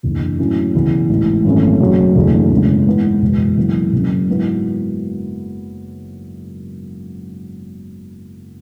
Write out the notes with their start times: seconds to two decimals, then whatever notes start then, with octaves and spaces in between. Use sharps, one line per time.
0.03 F#1 E2 D3
0.39 A2 F#3 C#4 E4
0.74 E1 E2 C#3
1.09 A1 G#2 E3
1.45 G#1 F#2 E3 A3 C#4
1.81 F#1 F#2 C#3 F#3
2.15 F#1 E2 D3 A3
2.51 F#1 E2 C#3 G#3
2.87 G#2 E3 B3 E4
3.22 F#1 E2 B2 G#3
3.57 F#1 F#2 E3 B3 E4
3.92 F#1 F#2 C#3
4.28 G#2 F#3 B3 E4